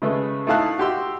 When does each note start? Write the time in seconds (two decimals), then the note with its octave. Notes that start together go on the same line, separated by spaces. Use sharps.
0.02 C#3 G#3 A3 B4
0.47 A3 D#4 E4 F5 A5 F#6
0.78 F#4 G4 C6 E6